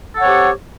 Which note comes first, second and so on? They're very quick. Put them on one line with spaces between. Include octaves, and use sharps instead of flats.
A4 F#5 C#5 C4 G4